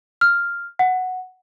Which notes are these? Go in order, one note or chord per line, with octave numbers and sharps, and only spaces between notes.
F6
F#5